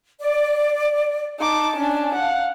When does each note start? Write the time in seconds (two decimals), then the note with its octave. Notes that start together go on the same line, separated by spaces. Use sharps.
0.20 D5
1.39 D#4 A5 D6
1.76 C#4 D4
2.15 F5 F#5